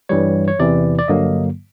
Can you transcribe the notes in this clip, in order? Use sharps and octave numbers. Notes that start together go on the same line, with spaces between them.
G2 E3 G3 C#5
C#5
E2 C3 E3 D5
D5
G2 D3 F#3 A#3 D#5